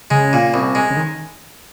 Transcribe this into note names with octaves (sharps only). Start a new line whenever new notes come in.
C#3 G#3
A#2
C2
G#3
C#3
D#3